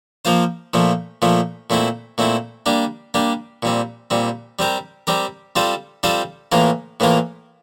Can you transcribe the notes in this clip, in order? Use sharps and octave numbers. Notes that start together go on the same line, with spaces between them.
F3 A#3 F4 C5
A#2 F3 A3
A#2 F3 A3
A#2 A3 C4 E4
A#2 A3 C4 E4
G3 A#3 D4 G4
G3 A#3 D4 G4
A#2 G3 C4
A#2 G3 C4
G3 C4 G4 A#4
G3 C4 G4 A#4
G3 C4 F4 A4 C5
G3 C4 F4 A4 C5
A2 E3 A#3 F4 A#4
A2 E3 A#3 F4 A#4